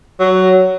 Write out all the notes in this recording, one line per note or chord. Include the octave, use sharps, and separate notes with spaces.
F#3